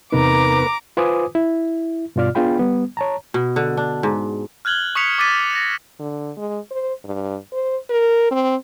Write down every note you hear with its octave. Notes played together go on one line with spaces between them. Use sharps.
E2 C3 B3 D#4 A#4 B4 A#5 D6
F4 B4 C5 G#5 D6 D#6
E4
G2 B2 F4 D5 F6
B3 D4 F4 G#4 G5 B5
G3 B3
C#5 A5 A#5
B2
D3
D4
G#2
F6 F#6 G#6 F#7 G7
C#6 D#6 B6 C#7 F7
D6 G#6 A6 B6 D#7
A6 A#6
D3
G#3
C5
G2
C5
A#4
C4